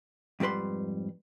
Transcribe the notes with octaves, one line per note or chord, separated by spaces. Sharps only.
F2 G#2 G3 B4 C6